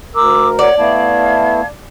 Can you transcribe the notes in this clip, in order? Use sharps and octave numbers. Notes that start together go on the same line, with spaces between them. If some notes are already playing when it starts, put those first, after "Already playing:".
D2 A#4 D6 E6
C#5 D5 F#5
A3 B3 E4 F5 A5 G#6